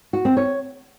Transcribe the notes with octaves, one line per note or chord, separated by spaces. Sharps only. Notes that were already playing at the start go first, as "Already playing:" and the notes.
F#4
C4
C#5